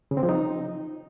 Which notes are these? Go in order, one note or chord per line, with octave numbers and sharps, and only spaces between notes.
C#3
C4
F3
D#4